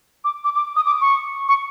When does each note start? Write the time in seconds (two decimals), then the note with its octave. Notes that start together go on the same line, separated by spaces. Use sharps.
0.24 D6
0.45 D6
0.55 D6
0.76 D#6
0.86 D6
1.01 C#6
1.48 C#6